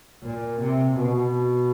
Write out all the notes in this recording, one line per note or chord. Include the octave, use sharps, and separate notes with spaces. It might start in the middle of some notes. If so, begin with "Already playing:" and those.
A#2
C3
B2